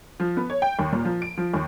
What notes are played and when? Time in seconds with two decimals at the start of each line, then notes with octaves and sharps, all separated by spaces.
0.20 F3
0.37 B3
0.50 C#5
0.62 G5
0.79 D#2
0.92 A#2
1.05 F3
1.22 D7
1.38 F3
1.54 D#2